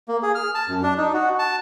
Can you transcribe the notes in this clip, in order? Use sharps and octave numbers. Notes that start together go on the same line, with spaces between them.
A#3
G#4
F6
A5
F#2
D4
D#4
F#4
A5